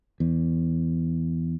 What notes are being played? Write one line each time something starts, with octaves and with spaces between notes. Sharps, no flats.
E2